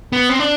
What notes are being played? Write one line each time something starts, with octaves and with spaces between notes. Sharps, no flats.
B3
C4
D4